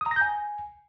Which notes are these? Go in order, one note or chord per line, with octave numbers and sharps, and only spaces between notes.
D#6
A#5
A#6
G6
G#5